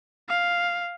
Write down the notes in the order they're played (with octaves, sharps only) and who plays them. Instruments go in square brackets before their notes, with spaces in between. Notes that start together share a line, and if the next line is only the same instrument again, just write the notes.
[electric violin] F5